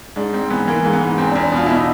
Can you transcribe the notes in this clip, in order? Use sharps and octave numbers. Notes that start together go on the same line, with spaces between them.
G#2 D4
G#2 C4
E3 B3
E3 A#3
G#2
B3
G#2
E2 C4
D4
E2
D4
B2 F4
B2 E4
D#4